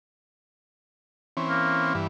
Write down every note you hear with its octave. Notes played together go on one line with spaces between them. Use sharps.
E3 C4 C#4
A#3
G2 E3